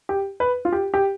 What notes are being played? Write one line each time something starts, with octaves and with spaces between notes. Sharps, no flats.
G4
B4
F4
G4
G4